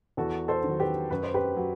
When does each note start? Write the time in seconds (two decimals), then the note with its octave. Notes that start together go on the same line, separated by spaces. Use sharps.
0.17 E2 F#4 A4
0.48 A4 C5
0.64 D#3
0.69 F#3
0.80 G4 B4
1.11 F#2 B4
1.23 C5
1.34 G4 B4
1.57 F#3